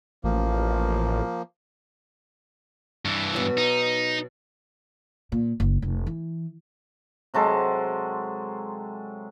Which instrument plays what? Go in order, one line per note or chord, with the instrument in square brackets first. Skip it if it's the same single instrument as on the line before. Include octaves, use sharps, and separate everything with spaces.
[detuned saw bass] A1 [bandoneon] F3 A#3
[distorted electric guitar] G2 E3
[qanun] B2 F#3 D5
[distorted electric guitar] D#4
[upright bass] A#2
F#1
F1
E3
[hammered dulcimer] C3 F#3 G#3 A4